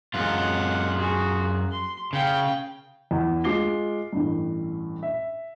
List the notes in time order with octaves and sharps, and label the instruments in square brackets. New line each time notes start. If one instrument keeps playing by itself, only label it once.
[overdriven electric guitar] F#2 F4 [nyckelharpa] G#3 F#5
[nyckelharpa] F#4 G#4
C6
[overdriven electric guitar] C#3 [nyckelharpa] F5 G5
[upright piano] E2
G#3 F4 D6 C7 G7
A1 G2
E5